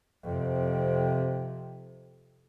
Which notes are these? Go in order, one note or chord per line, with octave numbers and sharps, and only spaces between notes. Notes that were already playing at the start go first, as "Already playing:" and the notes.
F2 C3